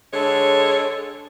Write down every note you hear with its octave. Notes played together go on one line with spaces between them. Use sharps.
D3 G#3 A4 C#5